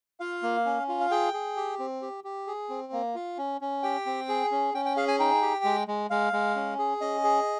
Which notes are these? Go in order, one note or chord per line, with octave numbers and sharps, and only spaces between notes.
F4 F5
A#3
C#4
F4
F5
G#4 G5
G#4
G4
C4
G4
G4
G#4
C4
A#3
F4
C#4
C#4
G4 G5
C4
G#4
C#4
C#4 G5
G5
G#4 F5
G#5
D#4 G5
G4
G#3
G#3
G#3 F5
G#3
C#4
G#4
C#4 D#5
G#4